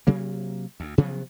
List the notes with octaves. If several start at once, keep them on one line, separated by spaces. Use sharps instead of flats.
C3 F#3 A#3
D2
C3 F3 F#3 B3